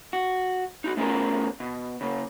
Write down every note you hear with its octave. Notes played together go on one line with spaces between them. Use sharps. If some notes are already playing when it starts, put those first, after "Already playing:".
F#4
D#4 F4 F#4
A3 B3 C#4 F4 G#4 A#4
B2
C#3 A#3